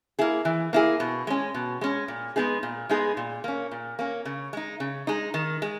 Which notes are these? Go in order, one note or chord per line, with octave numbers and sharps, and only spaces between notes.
A#3 E4 G#4
E3
A#3 E4 G#4
B2
G#3 C#4
B2
G#3 C#4
A#2
G#3 B3 D#4 G#4
A#2
G#3 B3 D#4 G#4
A#2
A#3 C#4
A#2
A#3 C#4
C#3
G#3 D#4
C#3
G#3 D#4
D#3
G#3